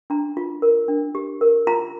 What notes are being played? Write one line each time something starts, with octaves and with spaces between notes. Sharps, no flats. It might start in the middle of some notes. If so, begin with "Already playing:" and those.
D4 A#5
F4
A#4
D4
G4
A#4
F4 A#5